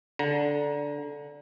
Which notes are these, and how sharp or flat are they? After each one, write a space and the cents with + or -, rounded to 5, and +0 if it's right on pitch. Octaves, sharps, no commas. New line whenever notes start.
D3 -10 A#5 +25